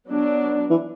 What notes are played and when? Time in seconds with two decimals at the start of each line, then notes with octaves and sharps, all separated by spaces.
0.08 F#3 B3 D4
0.70 E3